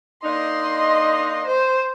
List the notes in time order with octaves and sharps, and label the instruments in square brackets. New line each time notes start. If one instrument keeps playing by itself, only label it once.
[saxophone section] A#3 D4 D#4 [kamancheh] D#5 C6
[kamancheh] C5